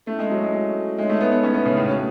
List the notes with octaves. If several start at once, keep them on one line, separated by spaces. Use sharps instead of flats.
A3 C#4 E4 A4
G#3
F#3
G#3
G#3 D#4 A4 C#5 E5
A3
B3
B3
C#4
B3
C#3
A2
A3 C#4 F#4